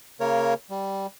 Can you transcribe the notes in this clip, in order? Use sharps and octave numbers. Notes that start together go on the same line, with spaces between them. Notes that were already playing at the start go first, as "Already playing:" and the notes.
C#3 A#3 A#4 C#5
G3